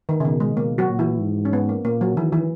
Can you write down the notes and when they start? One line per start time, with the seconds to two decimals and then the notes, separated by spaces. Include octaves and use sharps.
0.09 D#3
0.20 C#3
0.25 B2 D#3
0.40 G#3
0.56 B2 A#3
0.78 F#3 F#4
0.89 A#2
0.99 E3 E4
1.20 G#2
1.45 C#4
1.53 B3
1.69 A#3
1.85 A#2 A#3
2.01 F#3
2.16 D#3 E3
2.33 E3